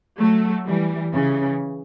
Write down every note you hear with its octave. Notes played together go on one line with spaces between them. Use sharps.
F#3 A3
E3 G3
C#3 E3